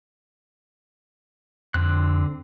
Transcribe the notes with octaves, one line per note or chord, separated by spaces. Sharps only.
F2 D3 C4 F#6